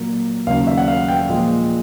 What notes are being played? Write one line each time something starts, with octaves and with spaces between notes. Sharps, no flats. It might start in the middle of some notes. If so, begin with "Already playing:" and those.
Already playing: A#2 F#3 A#3
D#2 C#3 F#3 F5
E5
F#5
F5
G5
A#2 F3 G#3